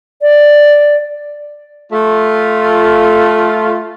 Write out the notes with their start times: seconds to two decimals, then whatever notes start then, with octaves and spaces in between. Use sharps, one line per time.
0.22 D5
1.92 A3 F4